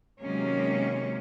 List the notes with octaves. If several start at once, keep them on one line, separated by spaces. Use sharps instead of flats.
C3 D#3 F#3 G#3 A#3 C#4